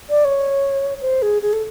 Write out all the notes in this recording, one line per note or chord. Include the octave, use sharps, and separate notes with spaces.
D5
C#5
C5
G#4
G#4
A4